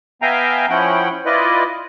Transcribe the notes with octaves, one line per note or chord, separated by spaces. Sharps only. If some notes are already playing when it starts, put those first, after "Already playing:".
B3 E5 F5 G5 G#5 A#5
F3 C#4 E4 F#5 G5
E4 F4 B4 D5 D#5